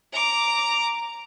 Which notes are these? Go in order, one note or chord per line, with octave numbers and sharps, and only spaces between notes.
A#5 D6